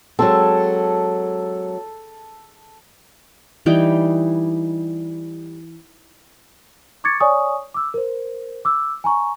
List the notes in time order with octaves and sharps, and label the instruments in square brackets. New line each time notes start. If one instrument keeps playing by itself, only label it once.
[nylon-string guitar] F#3 G#3 C4 [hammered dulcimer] A4
[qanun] E3 G3 D#4 G5
[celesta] C#6 D6 G#6 A6 C#7
C#5 D5 G#5 C#6 D#6
D6 E6
A#4 C5
D6 E6
G#5 A#5 C#6